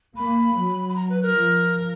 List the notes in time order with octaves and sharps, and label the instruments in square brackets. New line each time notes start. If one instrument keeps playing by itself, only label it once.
[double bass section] A#3 [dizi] B5
[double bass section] F#3
[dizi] B5
A#5
B4
A#4
[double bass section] F3